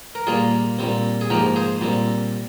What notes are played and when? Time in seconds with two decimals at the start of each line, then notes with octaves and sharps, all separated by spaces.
0.15 A#4
0.27 A#2 G3 A#3 F4 G#4
0.79 A#2 G3 C4
1.21 G#4
1.30 G#2 F3 A#3 G4 A#4
1.56 G#4 C5
1.81 A#2 G3 C4